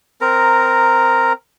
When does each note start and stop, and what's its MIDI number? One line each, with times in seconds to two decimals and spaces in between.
0.21 1.33 60
0.21 1.33 70
0.21 1.33 82